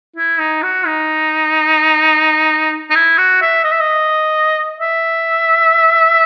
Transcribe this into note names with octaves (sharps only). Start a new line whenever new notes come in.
E4
D#4
F#4
D#4
D#4
E4
F#4
E5
D#5
E5
D#5
E5